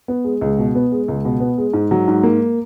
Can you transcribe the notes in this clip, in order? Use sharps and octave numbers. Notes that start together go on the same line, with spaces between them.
B3
G#3
C#2
B2
B3
G#3
C#2
B2
B3
G#3
G#2
F#3
G#2
A#3